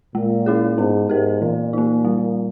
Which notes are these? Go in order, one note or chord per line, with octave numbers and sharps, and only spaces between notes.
A#2 G#3
C#4 E4 G#4
G#2 B3
G#2 G4 A#4
A#2 E3
A#3 D#4
G3